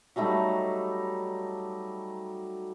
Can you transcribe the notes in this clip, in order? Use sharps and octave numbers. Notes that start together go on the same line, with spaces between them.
F#3 G3 A3 D#4